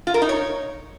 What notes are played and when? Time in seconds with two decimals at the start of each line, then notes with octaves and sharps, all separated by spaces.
0.07 F4
0.14 A#4
0.22 D#4
0.29 C#5